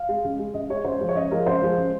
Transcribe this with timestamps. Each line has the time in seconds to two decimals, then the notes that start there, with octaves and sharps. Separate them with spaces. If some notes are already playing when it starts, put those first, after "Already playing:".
Already playing: F5
0.09 G#3
0.24 C#3
0.39 G#3
0.54 C#3 D#5
0.70 G#3 C#5
0.85 C#3 C5
1.01 F3 G#3
1.09 C#5
1.15 C#3 D#5
1.31 F3 G#3 A#4
1.46 C#3 C5
1.62 F3 G#3
1.78 C#3